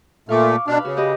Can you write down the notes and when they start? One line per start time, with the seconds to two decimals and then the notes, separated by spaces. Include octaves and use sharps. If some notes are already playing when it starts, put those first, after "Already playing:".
0.29 A#2 A3 F5 C#6 D6
0.68 B2 D4 B4 F5
0.85 C#3 F#4
0.97 G4 B4 D#5